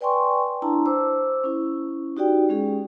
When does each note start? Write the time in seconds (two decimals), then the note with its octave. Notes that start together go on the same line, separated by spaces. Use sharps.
0.01 B4 D5 G5 G#5 C6 C#6
0.62 D4 E4 A5 A#5
0.86 C5 D6 E6
1.44 C#4 E4
2.17 D#4 F#4 G4 D5 G5
2.49 G#3 C#4 G#4